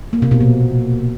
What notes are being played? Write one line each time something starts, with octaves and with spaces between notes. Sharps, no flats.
A#3
C3
B2
A#2